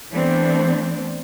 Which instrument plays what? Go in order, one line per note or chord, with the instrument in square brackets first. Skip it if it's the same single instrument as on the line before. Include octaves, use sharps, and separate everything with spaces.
[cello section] E3 A3 B3 C4 D4